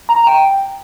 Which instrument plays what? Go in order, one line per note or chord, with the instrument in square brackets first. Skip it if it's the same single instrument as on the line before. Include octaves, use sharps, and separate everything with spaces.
[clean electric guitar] A#5
G5